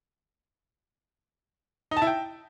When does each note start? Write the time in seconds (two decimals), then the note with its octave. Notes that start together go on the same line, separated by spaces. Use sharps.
1.91 D#4
1.97 A5
2.02 E4
2.07 G5